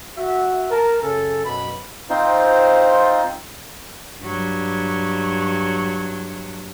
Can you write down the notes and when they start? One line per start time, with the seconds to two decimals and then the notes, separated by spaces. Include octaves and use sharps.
0.17 F#4 E5
0.70 A#4 A5
1.02 F#2 C#3 G#4 A4
1.44 F#2 B2 B5
2.10 C4 D#4 F4 C5
4.22 G2 F#3